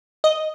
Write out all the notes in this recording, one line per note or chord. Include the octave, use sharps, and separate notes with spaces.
D#5